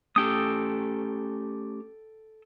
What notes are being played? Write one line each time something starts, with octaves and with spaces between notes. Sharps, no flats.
A3 C#4 G4 A4 G5 D#6